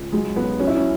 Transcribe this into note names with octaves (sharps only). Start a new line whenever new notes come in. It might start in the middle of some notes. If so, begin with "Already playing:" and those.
Already playing: C#2
F#3 G#3
B1 B3
F#3 C#4
E4
C#4